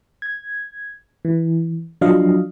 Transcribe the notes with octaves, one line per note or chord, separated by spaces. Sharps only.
G#6
E3
F3 F#3 D4 D#5 F5